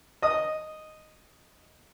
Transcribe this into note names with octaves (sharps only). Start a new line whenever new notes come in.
D#5 D#6